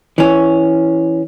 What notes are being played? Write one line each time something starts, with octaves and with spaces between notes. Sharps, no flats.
E3 C#4